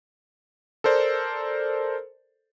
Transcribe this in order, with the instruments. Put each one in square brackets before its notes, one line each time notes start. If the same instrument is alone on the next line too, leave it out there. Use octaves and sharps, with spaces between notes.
[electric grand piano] A4 A#4 C5 D5